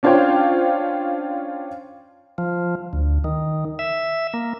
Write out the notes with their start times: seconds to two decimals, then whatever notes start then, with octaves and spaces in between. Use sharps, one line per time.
0.03 C#4 D4 F4 C5 C#5 G5
2.38 F3
2.93 D2
3.24 D#3
3.79 E5
4.34 A#3